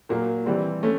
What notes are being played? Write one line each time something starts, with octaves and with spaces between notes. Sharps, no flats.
A#2 F#3 A#3
E3 G3 C4
A3 C#4